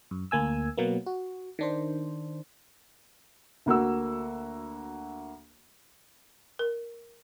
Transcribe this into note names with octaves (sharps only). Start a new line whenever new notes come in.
F#2
D2 A#3 G#5 E6
B2 F#3 A#3 B3
F#4
D#3 D4 C5
D2 A#3 F#4 E6
A#4